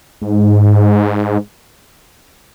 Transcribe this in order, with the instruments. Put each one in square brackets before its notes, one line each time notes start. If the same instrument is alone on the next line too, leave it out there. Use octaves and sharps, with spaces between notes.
[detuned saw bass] G#2